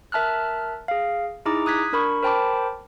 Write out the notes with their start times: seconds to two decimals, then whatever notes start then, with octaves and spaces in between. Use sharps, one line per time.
0.12 A#4 E5 A5 F6 F#6
0.88 G#4 F5
1.46 D#4 E4 G#4 A#5 D6
1.66 D#6 F#6 G#6 B6
1.92 D4 A#4 B5 C#6
2.23 A#4 C5 G5 A5 B5 D6